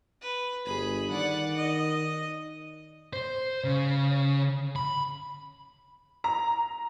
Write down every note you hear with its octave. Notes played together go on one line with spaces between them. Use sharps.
B4
G1 G#4 B5
D#3 D5 F#5
D#5
C5
C#3
B5
A#5